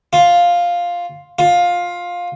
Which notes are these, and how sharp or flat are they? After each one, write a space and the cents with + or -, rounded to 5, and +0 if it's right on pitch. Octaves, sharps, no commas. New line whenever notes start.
F4 +5
F4 +15